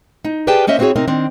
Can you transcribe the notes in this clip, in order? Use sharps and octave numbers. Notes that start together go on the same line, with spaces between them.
D#4
G4 G#4 B4 D5 G5 A5
A#3 C#4 C5 D#5 E5
B3 C4 E4 F#4 G#4 C#5
C3 C4 D#4 A#4
D#3 C4 D4